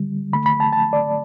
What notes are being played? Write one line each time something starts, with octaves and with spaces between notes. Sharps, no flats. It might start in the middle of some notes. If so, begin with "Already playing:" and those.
Already playing: D3 G3
D3 A3 B5
B5
A5
A5
D5